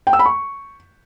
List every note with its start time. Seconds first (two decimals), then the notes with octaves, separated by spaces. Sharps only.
0.07 G5
0.13 E6
0.19 B5
0.26 C#6